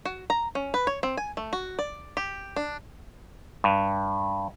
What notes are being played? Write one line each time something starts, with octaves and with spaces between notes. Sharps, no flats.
F#4
A#5
C#4
B4
C#5
C4
G#5
A3
F#4
D5
G4
D4
G2